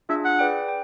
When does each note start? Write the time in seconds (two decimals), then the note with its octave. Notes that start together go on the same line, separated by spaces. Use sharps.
0.09 D4 F4 G#4 E5
0.25 F#5
0.39 G#4 B4 D5 G5
0.68 G5